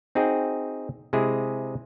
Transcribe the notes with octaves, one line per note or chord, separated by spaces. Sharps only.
C4 D#4 F#4 G#4 G5
C3 G#3 E4 G#4